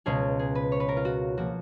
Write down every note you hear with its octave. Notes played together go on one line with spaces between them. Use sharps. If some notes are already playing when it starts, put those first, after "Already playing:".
C#2 B2 G#3 C#4 G#4
G#4
B4
C#5
B4
A#4
F4
F#4
C#3 F3 A#3 F#4